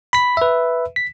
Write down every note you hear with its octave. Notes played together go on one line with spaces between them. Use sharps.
B5 B6
B4 E5
B6